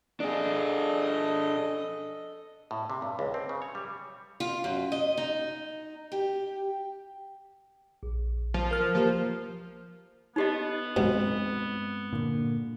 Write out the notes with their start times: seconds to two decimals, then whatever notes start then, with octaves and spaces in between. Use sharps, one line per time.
0.20 D4 G#4 A4 D#5
2.71 A2
2.90 C3
3.02 G2
3.19 C#2
3.34 C4
3.49 C#3
3.62 C#5
3.75 G3
4.40 F4
4.64 F#2
4.92 D#5
5.17 D#4
6.12 G4
8.03 A#1
8.54 F3
8.71 A#4 F6
8.95 F3 A#3 G4 A#4
10.36 B3 D#4 G4 D#5
10.96 B1 G2 B2 G#3 C4
12.13 A#2 D3 A#3